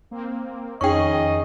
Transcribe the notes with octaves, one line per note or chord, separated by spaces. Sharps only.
A#3 C4
F2 D#3 C#4 D#4 G#4 D#5 G5 C#6